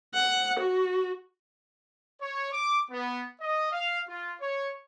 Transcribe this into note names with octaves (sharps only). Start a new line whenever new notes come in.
F#5
F#4
C#5
D6
B3
D#5
F5
F4
C#5